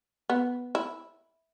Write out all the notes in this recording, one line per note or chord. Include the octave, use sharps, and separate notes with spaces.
B3
E4